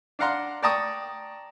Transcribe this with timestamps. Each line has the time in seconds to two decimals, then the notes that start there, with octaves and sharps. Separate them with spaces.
0.19 D4 D5 F5 F#5 A#5 C6
0.63 D5 G5 A5 A#5 C#6 D#6